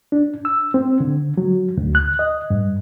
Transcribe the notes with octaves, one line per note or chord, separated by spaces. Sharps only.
D4
E6
C4
D3
F#3
D2
F#6
D#5
G2